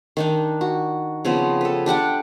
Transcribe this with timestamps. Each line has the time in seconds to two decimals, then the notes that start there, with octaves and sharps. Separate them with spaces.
0.17 D#3 D4 D#4
0.61 F#4
1.25 C#3 F3 B3 C4
1.61 A4 B4
1.86 D4 G4 F#5 G5